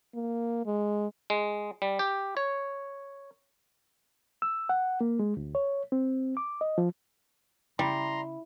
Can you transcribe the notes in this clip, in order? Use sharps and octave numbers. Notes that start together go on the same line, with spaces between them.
A#3
G#3
G#3
G3
G4
C#5
E6
F#5
A#3
G#3
D2
C#5
C4
D6
D#5
F3
C#3 G3 E4 A#5 C6